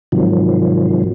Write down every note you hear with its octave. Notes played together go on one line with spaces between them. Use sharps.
G#2 C3 D#3 F3 F#3